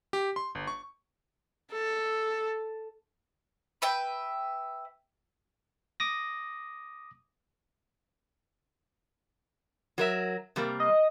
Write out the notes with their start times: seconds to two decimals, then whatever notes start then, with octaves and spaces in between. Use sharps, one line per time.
0.13 G4
0.36 C6
0.55 G1
0.67 C#6
1.72 A4
3.82 B4 E5 G5
6.00 D6 D#6 A#6
9.98 F#3 A#4 E5
10.56 C3 G3 A#3
10.80 D#5